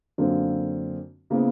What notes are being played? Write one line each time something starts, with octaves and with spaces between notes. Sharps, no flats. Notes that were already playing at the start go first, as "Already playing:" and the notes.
F#2 D3 A#3 C4 D4 F4
C#3 A#3 B3 E4 C5